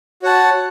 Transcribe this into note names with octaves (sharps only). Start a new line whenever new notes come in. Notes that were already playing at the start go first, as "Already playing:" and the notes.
F#4 C#5 F#5 A5